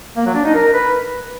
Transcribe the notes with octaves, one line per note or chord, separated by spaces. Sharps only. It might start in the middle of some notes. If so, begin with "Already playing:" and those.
A#3
F#3
D4
D#4
A#4
B4